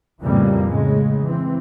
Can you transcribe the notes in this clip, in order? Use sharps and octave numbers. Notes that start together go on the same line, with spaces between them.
F2 A2 C#3 E3 G3 A#3
A2 C#3 G#3
E3 C4